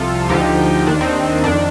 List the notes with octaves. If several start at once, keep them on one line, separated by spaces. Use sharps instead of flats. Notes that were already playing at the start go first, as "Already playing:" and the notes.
Already playing: C2 C3 F3 F4 A4
D2 D3 F3 D#4 G4
D#2 D#3 D4
C4 D#4
F2 D#3 D4